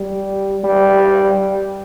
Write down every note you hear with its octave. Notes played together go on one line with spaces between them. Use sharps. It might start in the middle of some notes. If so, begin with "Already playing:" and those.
Already playing: G3
G3